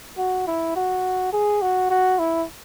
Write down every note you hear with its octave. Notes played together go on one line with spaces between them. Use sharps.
F#4
E4
F#4
G#4
F#4
F#4
E4